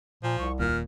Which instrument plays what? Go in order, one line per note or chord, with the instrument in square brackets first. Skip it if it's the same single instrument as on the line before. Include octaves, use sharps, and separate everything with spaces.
[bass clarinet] A#2 [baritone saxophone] F3
[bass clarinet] C2 [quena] C#6
[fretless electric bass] D#1 D#2 [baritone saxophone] A#2 [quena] F6